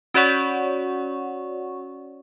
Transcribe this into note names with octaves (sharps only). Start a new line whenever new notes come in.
C#4 F#4 C#5 D5 F#5 C#6